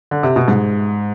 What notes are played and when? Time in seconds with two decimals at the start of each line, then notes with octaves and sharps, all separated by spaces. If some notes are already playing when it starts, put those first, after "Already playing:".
0.11 D3
0.23 C3
0.36 B2
0.48 G#2